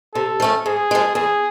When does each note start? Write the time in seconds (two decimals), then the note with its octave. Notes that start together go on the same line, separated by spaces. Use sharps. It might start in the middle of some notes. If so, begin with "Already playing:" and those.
0.14 C3 A4
0.40 F3 A3 C#4
0.66 G#2 G#4
0.91 F3 G#3
1.15 E2 G#4